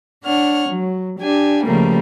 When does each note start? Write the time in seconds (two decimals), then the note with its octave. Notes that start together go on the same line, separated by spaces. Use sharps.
0.23 D4 C#5 F#5 F6
0.69 F#3
1.19 D4 G4 G#5
1.65 C#3 F3 G3 A3 A#3 A#4